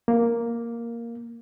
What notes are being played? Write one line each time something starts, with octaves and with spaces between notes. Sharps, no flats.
A#3